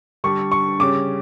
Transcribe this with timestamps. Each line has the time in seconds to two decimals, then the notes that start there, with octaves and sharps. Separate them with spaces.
0.24 D3 G3 D4 C#6
0.52 C#6
0.80 C#3 G3 C#4 D6